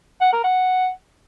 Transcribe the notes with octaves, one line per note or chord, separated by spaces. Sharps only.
F#5
A#4
F#5